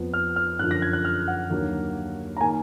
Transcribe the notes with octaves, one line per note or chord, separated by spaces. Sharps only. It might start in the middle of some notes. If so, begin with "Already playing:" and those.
Already playing: F2 F3 B3
F6
F6
F#2 D3 F3 F#6
A#6
G#6
F#6
F6
F#5
D#2 D3 F#3 A#3
A#5
D#3 A#3 G#5